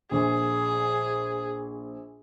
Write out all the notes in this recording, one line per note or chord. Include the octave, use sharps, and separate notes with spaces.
A#1 G#4